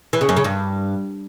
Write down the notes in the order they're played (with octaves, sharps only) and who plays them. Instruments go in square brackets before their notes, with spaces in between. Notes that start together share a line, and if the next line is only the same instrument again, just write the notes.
[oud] E3
C#3
F#2
C#3
G2